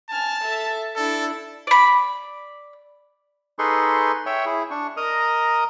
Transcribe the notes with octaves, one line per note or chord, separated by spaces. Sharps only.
G#5 A5 F6
A4 E5
D4 E4 A4
D5 B5
D#4 G#4 A4 B4 C6 C#6
C#5 E5 G5 C#6
E4 G#4
D4 C#6
A#4 D#5 A#5 D#6